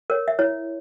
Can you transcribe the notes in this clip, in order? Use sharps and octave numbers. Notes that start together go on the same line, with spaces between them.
A#4 C#5
E5
E4 C#5